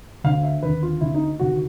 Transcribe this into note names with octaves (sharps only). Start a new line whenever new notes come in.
D2 D3 F5
E5
D#2 D3 B4
F4
D2 D3 E4
D#4
D2 C3 D#3 F#4